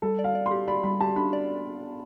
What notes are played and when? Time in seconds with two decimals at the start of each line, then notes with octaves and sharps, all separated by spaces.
0.02 G3 A4
0.19 D5
0.24 F5
0.35 D5
0.46 C6
0.51 G4
0.68 D5 B5
0.83 G3 B5
1.00 G4 A5
1.16 D4 B5
1.33 D5